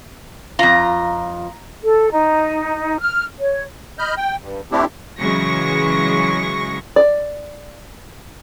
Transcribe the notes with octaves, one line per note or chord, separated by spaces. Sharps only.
F2 F4 A#5
A4
D#4
F6
C#5
D#5 B5 F6 G6
G5
G2
A3 C4 D4 E4 G4
C#3 E3 F#3 G#3 C#6 A#6
D5